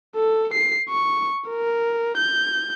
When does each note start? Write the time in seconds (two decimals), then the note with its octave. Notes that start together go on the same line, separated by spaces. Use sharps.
0.16 A4
0.54 C7
0.89 C#6
1.49 A#4
2.17 G6